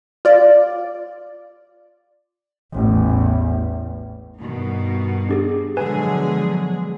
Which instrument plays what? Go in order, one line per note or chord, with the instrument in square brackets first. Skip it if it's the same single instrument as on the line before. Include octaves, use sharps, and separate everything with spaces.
[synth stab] F4 D5
[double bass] A1 E2
[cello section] G2 B2 D#3
[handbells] D4 G4 G#4
[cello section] B2 F3 G#4 [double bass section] D3 F#3 G#3 [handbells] B4 G#5